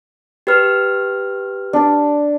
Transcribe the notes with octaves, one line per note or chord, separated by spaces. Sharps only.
G4 B4 F6
D4 D5